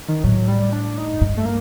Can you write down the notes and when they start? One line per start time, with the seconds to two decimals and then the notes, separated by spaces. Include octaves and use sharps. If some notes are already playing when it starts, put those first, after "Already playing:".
0.08 D#3
0.24 A2 F#3
0.48 G3
0.73 D4
0.97 D#4
1.21 G2
1.37 A3
1.45 A#3